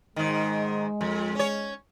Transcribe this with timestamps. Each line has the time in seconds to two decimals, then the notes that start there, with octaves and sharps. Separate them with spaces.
0.16 G#2 D#3 G#3
1.01 F2
1.35 C#4 C#5